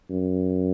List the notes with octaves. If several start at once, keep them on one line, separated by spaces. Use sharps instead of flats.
F#2